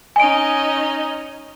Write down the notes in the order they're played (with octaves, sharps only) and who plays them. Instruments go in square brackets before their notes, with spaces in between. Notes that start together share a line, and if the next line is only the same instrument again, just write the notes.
[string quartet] C#4 D#4 D#5 [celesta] G#5 D7